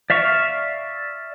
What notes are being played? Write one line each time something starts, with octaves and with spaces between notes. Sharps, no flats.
D5 E5 F5 C#6